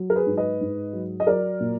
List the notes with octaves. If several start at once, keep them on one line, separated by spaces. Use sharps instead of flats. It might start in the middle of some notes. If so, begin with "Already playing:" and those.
Already playing: F#3
A#4
G#4 B4
G#2
B4 D#5
G#2
F#3
D#5
F#3 A#4 D5
A#2